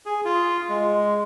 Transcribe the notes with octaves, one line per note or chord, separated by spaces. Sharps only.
G#4
F4
G#3